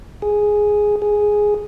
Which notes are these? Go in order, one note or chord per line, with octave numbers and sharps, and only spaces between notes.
G#4
G#4